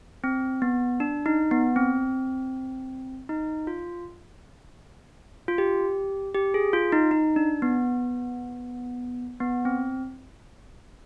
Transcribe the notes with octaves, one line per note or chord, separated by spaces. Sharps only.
C4
B3
D4
D#4
B3
C4
D#4
F4
F4
G4
G4
G#4
F4
D#4
D#4
D4
B3
B3
C4